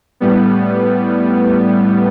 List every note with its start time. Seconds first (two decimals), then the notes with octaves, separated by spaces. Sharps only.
0.20 A2 G3 B3